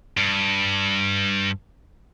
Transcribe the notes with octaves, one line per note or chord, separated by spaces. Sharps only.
G2